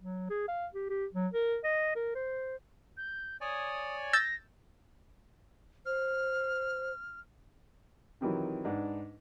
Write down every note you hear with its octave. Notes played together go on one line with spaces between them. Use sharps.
F#3
G#4
F5
G4
G4
F#3
A#4
D#5
A#4
C5
G6
C#5 D5 G#5 D#6
E6 G6 A6 A#6
C5 F6
C3 D#3 E3 F#3
G#2 D4 B4 F#5